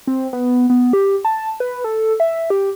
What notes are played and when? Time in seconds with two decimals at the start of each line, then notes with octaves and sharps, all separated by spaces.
0.07 C4
0.33 B3
0.70 B3
0.93 G4
1.25 A5
1.60 B4
1.84 A4
2.20 E5
2.50 G4